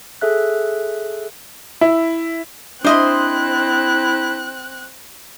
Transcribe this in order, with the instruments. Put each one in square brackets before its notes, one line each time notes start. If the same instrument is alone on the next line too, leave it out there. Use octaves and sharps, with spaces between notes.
[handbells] G#4 A4 E5 F#6
[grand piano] E4
[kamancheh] C4 F#6 [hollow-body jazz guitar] D4 E5 [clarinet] E4 [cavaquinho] C5 D#5 C6